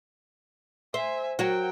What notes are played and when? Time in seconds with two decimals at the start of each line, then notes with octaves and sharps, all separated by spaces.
0.94 C5 E5 G#5
1.39 F#3 F#4 A#4 G5